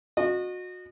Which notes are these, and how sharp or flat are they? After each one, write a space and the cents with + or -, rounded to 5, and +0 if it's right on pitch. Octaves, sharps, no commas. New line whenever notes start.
F#4 -30 D#5 -30